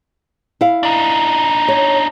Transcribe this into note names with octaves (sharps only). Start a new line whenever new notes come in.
E4 F5
D4 D#4
C#5